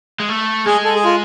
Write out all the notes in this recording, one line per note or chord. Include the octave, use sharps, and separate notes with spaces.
G#3
A3
G#3 G#4
A4
G#4
F4